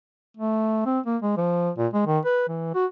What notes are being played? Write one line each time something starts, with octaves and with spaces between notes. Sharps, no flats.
A3
C4
A#3
G#3
F3
A#2
G#3
D#3
B4
E3
F#4